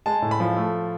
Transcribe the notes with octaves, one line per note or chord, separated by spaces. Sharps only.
G#3 A5
A2
B5
F3
A3